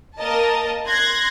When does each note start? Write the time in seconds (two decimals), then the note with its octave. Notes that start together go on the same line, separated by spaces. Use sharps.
0.18 A#3 A#4 D#5 A5
0.87 C6 F#6 G#6 A#6